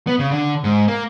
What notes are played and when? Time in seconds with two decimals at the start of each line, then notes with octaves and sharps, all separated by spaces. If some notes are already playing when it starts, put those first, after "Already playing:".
0.07 B3
0.19 C#3
0.31 D3
0.64 G#2
0.88 A#3